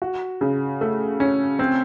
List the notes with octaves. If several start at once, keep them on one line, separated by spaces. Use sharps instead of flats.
F#4
C#3
A3
C#4
C4